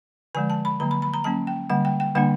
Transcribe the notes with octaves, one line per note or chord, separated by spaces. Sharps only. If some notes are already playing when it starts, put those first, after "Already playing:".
D3 F3 G#3 G#5
A5
B5
D3 F#3 A#3 A#5
B5
B5
A#5
F#3 A#3 C#4 A5
G5
D3 G3 A#3 F#5
G5
G5
D3 G3 A#3 D4 F#5